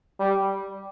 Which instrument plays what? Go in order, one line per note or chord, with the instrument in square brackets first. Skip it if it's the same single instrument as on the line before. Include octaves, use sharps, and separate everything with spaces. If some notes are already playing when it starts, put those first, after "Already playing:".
[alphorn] G3